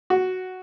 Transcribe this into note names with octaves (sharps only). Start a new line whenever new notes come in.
F#4